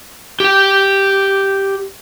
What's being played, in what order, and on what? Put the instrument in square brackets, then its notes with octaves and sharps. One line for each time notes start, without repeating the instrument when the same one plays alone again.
[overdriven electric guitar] G4 G5